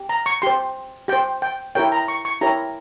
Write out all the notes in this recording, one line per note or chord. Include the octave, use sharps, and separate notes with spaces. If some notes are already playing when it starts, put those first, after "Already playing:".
Already playing: G4
A#5
C#6
G4 C5 C6
G4 C5 G5
G5
E4 G4 A#4 C#5 G5
A#5
C#6
C#6
E4 G4 A#4 C#5 A#5